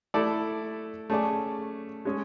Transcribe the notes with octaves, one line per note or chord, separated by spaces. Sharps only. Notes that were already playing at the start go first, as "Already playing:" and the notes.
A3 E4 A4 D5
A3 C#4 G#4 D5
G#3 C#4 G#4